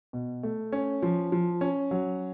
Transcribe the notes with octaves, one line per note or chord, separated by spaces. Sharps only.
B2
A3
C#4
F3
F3
C#4
F#3